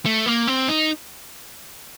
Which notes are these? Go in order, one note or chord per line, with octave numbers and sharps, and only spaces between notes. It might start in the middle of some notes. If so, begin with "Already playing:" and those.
A3
A#3
C4
D#4